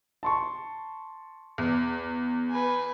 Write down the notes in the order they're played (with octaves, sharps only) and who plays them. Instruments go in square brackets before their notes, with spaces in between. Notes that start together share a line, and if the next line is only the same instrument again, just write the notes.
[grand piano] A5 C6 C#6
[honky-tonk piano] E2
[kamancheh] B4 G#5